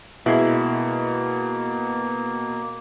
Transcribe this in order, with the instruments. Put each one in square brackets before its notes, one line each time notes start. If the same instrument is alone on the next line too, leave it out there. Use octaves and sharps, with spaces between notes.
[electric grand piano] B2 [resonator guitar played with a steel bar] G#3 E4 [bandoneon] A#3